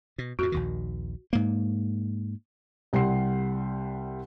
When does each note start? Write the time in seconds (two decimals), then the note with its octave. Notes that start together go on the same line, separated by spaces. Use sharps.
0.18 B2
0.39 F2 A2 F#4
0.52 A#1 D#2 D#3
1.33 G#2 A#3
2.93 C2 G3 F#5 C6 C7